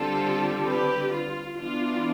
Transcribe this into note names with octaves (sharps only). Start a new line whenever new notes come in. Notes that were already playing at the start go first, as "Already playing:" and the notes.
Already playing: D3 G3 C4 F4 A4
G4 B4
F4
E3 B3 D4 F4